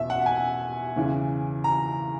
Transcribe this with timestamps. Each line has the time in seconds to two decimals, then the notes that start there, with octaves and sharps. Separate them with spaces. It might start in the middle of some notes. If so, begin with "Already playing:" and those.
Already playing: E2 B2 E5
0.10 F#5
0.26 G#5
0.96 E2 C#3 E3
1.64 A#5